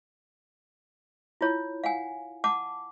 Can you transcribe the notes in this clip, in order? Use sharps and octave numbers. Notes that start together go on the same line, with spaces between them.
E4 F4 C#5
F5 F#5 G#5
F#5 A5 D6